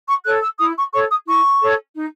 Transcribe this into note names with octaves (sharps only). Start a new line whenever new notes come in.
C#6
A4 C#5 F#6
E6
E4 D#6
C#6
A4 C#5 C#6
D#6
E4 C#6
A4 C#5
D#4